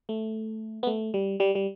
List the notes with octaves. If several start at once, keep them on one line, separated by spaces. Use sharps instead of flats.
A3
B3
A3
G3
G3
G3